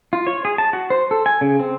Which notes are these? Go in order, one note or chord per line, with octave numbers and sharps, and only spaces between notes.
F4
C#5
G#4
A5
F#4
C5
A4
G#5
C#3
C4